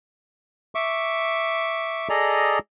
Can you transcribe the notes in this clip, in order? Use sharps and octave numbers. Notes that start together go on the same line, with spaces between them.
E5 C#6 D6
G#4 A4 D5 D#5 A#5